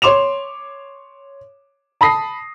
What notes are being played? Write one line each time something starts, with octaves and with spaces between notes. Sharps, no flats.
C#5 C6 D6 E7 F7
A5 B5 D#6 A#6 C7